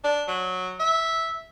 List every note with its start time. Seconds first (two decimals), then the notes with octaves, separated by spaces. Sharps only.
0.04 D4
0.28 F#3
0.80 E5